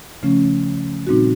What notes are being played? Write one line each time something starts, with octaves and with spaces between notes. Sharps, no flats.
C#3 F3 A3 C#4
A#2 G3 C4 D#4 F#4